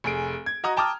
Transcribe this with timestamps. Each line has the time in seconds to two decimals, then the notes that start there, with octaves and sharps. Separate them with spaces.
0.04 F1 G#4 D7
0.46 G#6
0.64 F#4 D#5 A#5 D#6
0.77 G5 A5 A#5 D6 D#6 F6